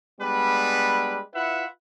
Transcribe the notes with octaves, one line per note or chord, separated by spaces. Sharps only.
G3 G#3 B3 D4 B4
E4 F4 B4 E5 F#5